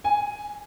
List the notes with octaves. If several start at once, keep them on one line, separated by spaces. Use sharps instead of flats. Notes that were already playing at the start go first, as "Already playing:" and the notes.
G#5